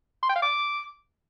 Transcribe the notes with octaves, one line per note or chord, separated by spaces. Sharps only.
C6
G5
F5
D6